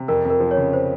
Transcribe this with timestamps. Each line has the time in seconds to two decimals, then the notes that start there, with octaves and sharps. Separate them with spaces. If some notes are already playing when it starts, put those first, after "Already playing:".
Already playing: C3
0.08 F2 A#4
0.25 F2
0.30 A#4
0.40 F3
0.51 C#5
0.57 C#3
0.73 C5